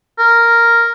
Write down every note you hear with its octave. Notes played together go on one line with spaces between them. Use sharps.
A#4